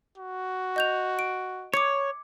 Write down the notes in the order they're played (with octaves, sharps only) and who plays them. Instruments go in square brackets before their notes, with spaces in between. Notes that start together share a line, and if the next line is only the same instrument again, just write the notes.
[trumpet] F#4
[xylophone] D#5 G6 F7
D7
[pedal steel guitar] C#5 [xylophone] D6 G#6 C#7